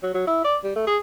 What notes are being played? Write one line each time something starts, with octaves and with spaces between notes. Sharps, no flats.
F#3
F#3
E4
D5
G3
A3
G#4